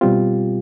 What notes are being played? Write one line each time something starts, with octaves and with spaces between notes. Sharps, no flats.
B2 G3 C4 F4 G4